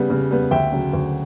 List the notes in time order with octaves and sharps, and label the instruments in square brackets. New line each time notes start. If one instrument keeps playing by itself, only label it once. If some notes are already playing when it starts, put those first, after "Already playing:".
Already playing: [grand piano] C#3 G3 B3
C#3
G3 B3
D2 E5 G5
C#3 F#3
D2